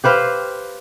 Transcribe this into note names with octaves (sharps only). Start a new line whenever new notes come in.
G4 B4 C5 F5